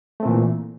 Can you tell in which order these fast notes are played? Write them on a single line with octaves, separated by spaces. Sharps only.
A3 C4 A#2 E3